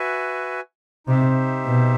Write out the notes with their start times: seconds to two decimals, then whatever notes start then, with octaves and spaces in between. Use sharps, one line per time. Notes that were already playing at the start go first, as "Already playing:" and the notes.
Already playing: F#4 B4 E5 G#5
1.07 C3 D#4 G4 C5 E5
1.65 B2